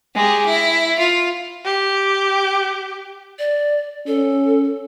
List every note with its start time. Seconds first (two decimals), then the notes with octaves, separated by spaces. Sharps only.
0.15 G#3 G4
0.46 E4
0.99 F4
1.65 G4
3.39 D5
4.07 C#4 A4